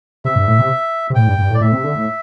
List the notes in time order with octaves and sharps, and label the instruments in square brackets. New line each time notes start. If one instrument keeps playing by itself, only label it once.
[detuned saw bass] C3 [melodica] E5
[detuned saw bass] G2
A2
C3
C3
[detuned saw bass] A2 [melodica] G5
[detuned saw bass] G2
G2
A2
[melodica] D5
[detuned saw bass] A2 [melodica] E5
[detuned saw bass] C3
D3
A2